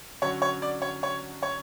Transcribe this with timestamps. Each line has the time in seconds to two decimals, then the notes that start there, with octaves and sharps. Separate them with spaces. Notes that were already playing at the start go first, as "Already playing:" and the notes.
0.22 D3 F#3 C#4 C#5
0.42 C#5
0.62 D5
0.82 C#5
1.03 C#5
1.43 C#5